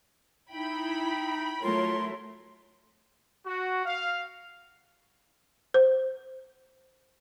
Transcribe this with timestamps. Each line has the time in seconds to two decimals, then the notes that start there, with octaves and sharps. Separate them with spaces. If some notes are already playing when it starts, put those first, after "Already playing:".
0.52 D#4 E4 G5 B5
1.63 F#3 A3 E4 F4 A#4 C#5 C6
3.46 F#4
3.86 F5
5.74 C5